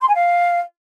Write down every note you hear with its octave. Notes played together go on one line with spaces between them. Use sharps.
C6
G#5
F5